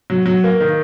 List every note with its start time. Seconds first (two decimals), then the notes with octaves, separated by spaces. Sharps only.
0.10 F#3
0.26 F#3
0.44 A#3
0.60 D#3